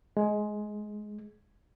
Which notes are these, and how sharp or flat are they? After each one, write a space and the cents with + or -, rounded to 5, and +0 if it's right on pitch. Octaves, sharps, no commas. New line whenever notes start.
G#3 +15